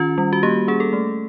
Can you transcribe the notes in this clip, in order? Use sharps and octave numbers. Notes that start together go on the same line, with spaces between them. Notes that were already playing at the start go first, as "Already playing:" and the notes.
Already playing: D#3 C#4 F4
G3
F#4
A#3 G4
C#4 G#4
A4
A3